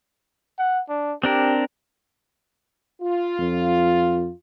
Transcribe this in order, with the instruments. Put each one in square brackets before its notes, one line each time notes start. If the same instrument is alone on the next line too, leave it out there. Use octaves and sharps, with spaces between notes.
[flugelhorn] F#5
D4
[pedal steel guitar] C4 D4 A#4 [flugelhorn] G4
[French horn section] F4
[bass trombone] F2